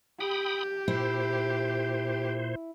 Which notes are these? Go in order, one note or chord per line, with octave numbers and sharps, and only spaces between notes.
G4 G5 B5 D#6
A#2 E4 C5